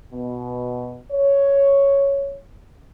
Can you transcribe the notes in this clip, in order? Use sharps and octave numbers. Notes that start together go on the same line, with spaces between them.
B2
C#5